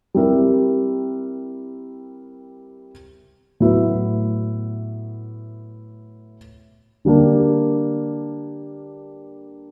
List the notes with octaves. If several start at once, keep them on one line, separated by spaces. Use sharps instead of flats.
G3 C4 E4 G4 A#4
A2 F#3 B3 E4
D3 G3 A#3 D4